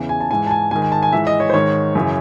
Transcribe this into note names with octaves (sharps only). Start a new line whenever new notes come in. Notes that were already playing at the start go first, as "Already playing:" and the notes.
Already playing: E2 C#3 E3
G#5
A5
G#2 E3 G#5
A5
G#5
G#2 D#3 G#5
G#5
A5
G#5
G#2 E3 E5
D#5
C#5
C5
G#2 D#3 C#5
F#2 C#3 E3